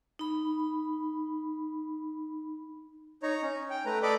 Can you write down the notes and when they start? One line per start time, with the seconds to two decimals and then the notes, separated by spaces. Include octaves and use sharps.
0.19 D#4 B5
3.23 D#4 C#5 A#5
3.42 C#4
3.70 G5
3.86 A3 B4 A#5
4.03 A4 D5 D#5 B5 D6